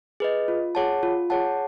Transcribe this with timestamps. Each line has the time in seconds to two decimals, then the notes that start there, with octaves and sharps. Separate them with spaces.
0.20 G#4 B4 D#5
0.48 F4
0.75 G#4 C#5 F#5 A5
1.03 F4
1.30 G#4 C#5 F#5 A5